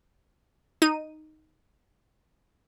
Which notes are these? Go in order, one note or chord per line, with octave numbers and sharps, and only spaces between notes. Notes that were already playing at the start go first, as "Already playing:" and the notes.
D#4 D#7